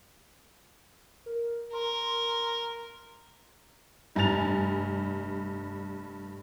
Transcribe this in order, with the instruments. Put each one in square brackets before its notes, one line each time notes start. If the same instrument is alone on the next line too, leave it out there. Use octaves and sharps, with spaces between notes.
[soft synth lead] A#4
[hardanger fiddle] A#4 [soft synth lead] C6
[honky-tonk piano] F1 G2 G#5 A#5 A6 F7